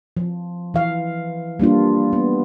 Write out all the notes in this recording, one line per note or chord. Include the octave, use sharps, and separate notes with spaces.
F3
E3 F5
G3 A#3 D4 F4
B3